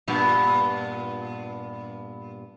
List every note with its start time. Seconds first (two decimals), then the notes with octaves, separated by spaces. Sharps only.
0.08 G2 A#2 B3